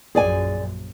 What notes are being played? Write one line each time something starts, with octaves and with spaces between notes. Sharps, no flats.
A#1 F#2 G#4 D5 G#5